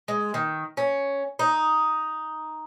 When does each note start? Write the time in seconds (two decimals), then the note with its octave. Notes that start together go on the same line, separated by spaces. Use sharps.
0.08 G#3
0.34 D#3
0.77 C#4
1.39 D#4